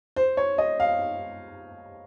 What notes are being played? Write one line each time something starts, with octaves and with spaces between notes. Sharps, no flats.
C5
C#5
D#5
F5